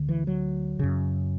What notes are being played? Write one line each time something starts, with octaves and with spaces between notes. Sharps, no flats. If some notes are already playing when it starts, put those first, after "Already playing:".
Already playing: D2 D3
E3
F#3
F#2 C#3